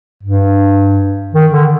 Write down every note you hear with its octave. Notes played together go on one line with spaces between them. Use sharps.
G2
D#3
D3